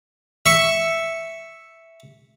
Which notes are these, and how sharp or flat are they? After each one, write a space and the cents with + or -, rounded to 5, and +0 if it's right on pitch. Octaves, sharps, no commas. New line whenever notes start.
E5 +0 C#6 +0